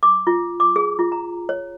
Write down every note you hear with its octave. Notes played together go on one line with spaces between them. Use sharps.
D6
F4
D6
G#4
F4
A#5
C#5